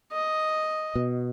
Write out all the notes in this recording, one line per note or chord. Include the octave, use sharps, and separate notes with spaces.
D#5
B2